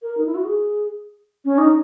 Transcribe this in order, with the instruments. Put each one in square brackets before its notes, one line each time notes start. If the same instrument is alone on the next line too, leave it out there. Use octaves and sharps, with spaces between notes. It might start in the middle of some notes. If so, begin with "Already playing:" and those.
[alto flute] A#4
D#4
E4
F#4
G#4
C#4
D#4